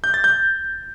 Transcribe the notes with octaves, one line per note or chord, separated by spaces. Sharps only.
G6
A6
G6